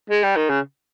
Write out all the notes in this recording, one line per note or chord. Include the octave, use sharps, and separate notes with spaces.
G#3
G3
D#3
C#3